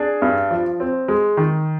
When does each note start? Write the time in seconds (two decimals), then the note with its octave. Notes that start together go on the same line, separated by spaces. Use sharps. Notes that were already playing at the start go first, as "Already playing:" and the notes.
Already playing: D4 G#4
0.22 G2
0.51 F3
0.80 C4
1.08 G#3
1.37 D#3